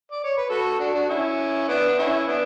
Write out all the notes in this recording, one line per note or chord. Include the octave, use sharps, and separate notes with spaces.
D5
C#5
B4
F#4 A4
D4 F#4
D4 F#4
C#4 E4
B3 D4
D4
C#4 E4
B3 D4